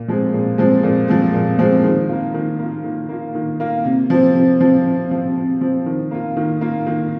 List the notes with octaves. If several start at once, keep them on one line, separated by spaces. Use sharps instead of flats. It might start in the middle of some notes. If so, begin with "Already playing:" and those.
Already playing: A#2
F3 G#3 C4
A#2
F3 G#3 C4
A#2
F3 G#3 C4
A#2
F3 G#3 C4
D#3
A#3 F4
D#3
A#3 F4
D#3
A#3 F4
D#3
A#3 F4
C3
F3 C4
C3
F3 C4
C3
F3 C4
C3
F3 C4
D#3
A#3 F4
D#3
A#3 F4
D#3